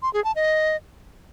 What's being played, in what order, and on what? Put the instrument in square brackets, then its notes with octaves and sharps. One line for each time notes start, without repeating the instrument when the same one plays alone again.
[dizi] C6
G#4
A5
D#5